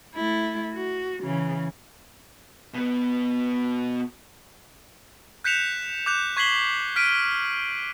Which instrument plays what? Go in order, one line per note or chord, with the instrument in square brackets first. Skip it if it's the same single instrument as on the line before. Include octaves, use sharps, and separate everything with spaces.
[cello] A3 E4
F#4
C#3 E3
[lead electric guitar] B2 B3
[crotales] F#6 G6 B6 C#7 E7 F7
D6 F#6 G6 E7 F7
C#6 G#6 B6 C7 F#7 G7
F6 B6 D7 D#7